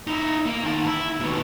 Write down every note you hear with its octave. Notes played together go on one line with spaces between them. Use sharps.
D#4 E4
A#3
D#3 A5
E4
D#2 B2